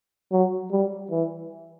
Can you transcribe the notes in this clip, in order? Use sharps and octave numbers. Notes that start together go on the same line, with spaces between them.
F#3
G3
E3